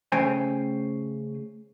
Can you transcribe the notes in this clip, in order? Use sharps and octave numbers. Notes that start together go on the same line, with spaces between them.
C#3 A3 C5 G5 G#5